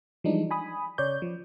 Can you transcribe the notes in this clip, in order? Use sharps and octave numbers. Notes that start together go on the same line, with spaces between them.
E3 F3 G3 G#3 D4 D#4
G#5 B5 D#6
C#3 C#5 D5 G6
F3